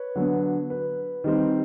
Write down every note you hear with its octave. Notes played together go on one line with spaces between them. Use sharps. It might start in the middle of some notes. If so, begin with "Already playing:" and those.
Already playing: B4 C#5
D3 F#3 B3
B4
D#3 G3 C4